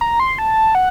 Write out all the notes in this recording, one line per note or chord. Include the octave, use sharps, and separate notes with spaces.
A#5
C6
A5
F#5